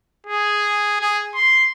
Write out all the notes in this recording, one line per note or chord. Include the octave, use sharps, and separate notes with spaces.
G#4
G#4
C6